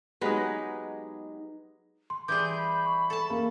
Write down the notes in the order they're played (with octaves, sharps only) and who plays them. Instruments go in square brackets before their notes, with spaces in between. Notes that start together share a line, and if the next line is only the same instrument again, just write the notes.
[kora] F#3 G#3 [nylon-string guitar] B3 [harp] D#4 G4 B5
[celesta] C6
[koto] E3 G3 G#4 [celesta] D6 [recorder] G6
[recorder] B5
[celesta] C#6
[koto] A4 A5
[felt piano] A#3